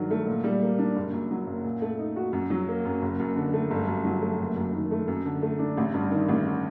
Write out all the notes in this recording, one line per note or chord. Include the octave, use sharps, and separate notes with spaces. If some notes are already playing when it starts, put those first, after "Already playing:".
Already playing: G2 D#3 F#3
A3
A#2
G3
A#3
D4
F#1
F#2
F#3
F#1
A#2
A3
D#4
F#4
F#2
F#3
A#3
F#2
F#1
F#2
D3
A3
G1
F#2
F#3
A3
F#1
F#2
D#3
A3
F#2
D3
A3
D4
A1
G2
D#3
A1